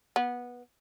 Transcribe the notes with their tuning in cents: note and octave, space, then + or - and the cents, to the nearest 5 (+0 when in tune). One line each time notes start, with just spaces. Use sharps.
B3 -15